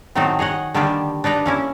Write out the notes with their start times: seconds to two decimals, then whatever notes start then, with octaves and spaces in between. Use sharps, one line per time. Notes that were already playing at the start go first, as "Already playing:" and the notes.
0.15 A2 D#3 F#3 A3 C4 D#4
0.39 G#4 C#5 D#5 F#5
0.74 D3 D#3 G3 A#3 D4 G4
1.24 D4 D#4 B4 A#5
1.46 A#3 C#4 E4